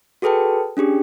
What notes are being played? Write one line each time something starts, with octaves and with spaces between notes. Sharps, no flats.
F#4 G#4 A4 B4 G5 A5
C#4 D4 G4 G#4